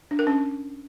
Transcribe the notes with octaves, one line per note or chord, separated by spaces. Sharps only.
D4
A#4
C#4